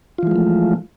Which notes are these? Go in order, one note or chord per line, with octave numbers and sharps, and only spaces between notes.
E3 F3 G#3 A3 F4